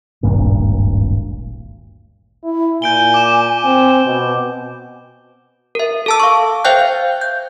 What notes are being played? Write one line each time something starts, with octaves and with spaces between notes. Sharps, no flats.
D1 G#1 G2 A#2
E4
A#2 G#5 G6 D7 G7
D6 E7
C4
B2
A#4 E5
A4 A5 E6
F5 C#6
C5 E5 F5 G5 F#6 G6
G6